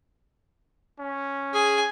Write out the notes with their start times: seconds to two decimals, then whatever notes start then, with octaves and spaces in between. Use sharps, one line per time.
0.99 C#4
1.54 G#4 G#5